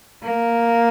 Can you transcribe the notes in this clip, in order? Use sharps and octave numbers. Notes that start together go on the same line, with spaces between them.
A#3